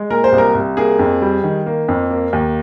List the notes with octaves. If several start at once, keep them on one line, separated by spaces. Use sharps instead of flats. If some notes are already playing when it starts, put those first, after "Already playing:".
Already playing: G#3
A#2 A#4
C5
C2
A#4
C2
A#3 G#4
F2
G3
D#3
A#3
F2
A#3
D#2